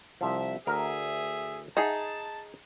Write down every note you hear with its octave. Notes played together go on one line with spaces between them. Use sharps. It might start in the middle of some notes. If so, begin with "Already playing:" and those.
C2 F3 E5
D2 G#4 A#4 E5
D#4 G#4 E5 F#5 A5